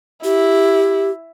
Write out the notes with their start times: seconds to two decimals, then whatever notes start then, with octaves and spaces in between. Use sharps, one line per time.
0.24 E4 G4